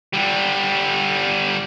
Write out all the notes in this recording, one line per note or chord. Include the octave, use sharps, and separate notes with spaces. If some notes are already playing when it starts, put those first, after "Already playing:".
D3 G3